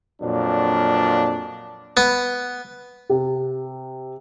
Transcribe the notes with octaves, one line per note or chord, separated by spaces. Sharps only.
F2 A#2 F#3 D4
B3
C3